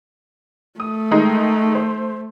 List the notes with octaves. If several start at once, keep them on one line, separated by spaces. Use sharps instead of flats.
A3 D#6
D#3 G#3 D#4
C5